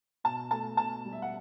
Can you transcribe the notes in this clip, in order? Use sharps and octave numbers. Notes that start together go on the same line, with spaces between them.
B2 A5
A3 A5
B2 A5
G3
E5
F#5